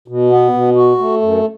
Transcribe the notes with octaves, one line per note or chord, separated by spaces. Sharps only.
B2
B3
B2
F#4
A3
F#2